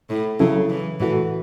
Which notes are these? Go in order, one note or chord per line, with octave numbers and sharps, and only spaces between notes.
A2
C#3 F#3 C#4 E4 A4
E3
A2 E3 A3 F#4 A4